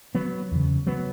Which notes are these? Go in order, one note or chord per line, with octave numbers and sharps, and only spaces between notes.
F#3 B3
E2 C#3
F#3 B3